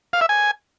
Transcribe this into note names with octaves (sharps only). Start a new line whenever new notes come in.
F5
E5
G#5